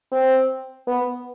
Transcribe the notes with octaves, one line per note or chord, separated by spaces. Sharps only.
C4
B3